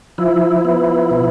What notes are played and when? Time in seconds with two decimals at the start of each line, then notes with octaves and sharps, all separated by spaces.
0.18 F3 E4
0.65 B3
1.11 B2